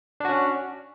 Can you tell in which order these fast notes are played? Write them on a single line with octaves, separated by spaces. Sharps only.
D4 F#4 C#4